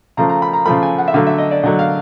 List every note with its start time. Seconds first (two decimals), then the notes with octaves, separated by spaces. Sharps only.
0.17 C#3 F3 A3 A#5
0.29 A#5
0.42 B5
0.53 A#5
0.66 C#3 F3 A3 B5
0.83 G#5
0.98 F#5
1.08 E5
1.14 D3 F#3 A3 F5
1.27 E5
1.38 D#5
1.51 D5
1.63 D3 F#3 A3 D#5
1.79 F5